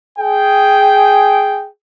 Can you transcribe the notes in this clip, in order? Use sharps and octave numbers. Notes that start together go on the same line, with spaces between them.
G#4 G5